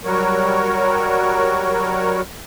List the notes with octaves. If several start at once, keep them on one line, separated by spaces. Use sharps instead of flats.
F#3 G3 F#4 A#4 C#5